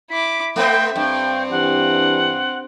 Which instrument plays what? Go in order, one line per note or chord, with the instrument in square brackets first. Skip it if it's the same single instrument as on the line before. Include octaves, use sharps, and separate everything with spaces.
[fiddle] E4 D6 [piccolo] B6
[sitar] A3 B3 C4 [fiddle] E5 [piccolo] G5
[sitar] G2 [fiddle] C4 [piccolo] G5
[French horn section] E3 D4 G4 [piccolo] F#5